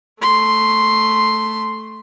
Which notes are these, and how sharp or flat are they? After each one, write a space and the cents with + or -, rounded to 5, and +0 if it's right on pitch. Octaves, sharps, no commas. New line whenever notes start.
A3 +0 C6 +0